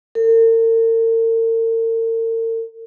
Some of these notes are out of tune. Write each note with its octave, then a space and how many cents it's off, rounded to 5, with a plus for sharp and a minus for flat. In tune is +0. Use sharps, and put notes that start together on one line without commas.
A#4 -45